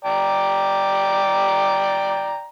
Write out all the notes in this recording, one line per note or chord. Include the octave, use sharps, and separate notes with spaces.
D5 G5 A#5